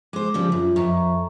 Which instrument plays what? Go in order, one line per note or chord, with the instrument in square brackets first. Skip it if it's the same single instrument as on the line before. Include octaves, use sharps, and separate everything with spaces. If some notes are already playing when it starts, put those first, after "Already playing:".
[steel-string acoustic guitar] G#3 C5 [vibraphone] D6
[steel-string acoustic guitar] C#3 F3 G3
[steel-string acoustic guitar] F#2 [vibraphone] F4
[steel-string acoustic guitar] F2 [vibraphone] E5 A#5 C#6